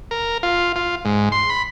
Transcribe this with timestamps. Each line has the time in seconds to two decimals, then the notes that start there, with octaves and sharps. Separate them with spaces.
0.11 A#4
0.43 F4
0.76 F4
1.05 G#2
1.32 C6
1.50 B5